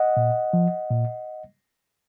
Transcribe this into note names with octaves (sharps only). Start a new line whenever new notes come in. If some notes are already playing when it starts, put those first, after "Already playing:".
Already playing: D#5 F#5
A#2
F3
A#2